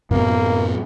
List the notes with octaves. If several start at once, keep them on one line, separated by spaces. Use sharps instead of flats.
F#2 A2 C3 F#3 A#3 B3